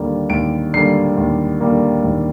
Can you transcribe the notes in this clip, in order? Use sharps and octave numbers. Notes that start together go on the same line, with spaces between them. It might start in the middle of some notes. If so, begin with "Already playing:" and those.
Already playing: D#2 D3 G3 A#3
D#2 D7
D3 G3 A#3 C7
D#2
D3 G3 A#3
D#2